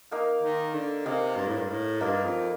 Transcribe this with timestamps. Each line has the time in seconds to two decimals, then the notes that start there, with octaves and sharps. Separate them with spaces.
0.11 A#3 D#4 A#4 F5
0.43 D#3
0.74 D3
1.06 C3 A#3 D#4 A#4 F5
1.37 G2
1.47 A2
1.57 G2
1.68 A2
2.01 G2 A#3 D#4 A#4 F5
2.24 F2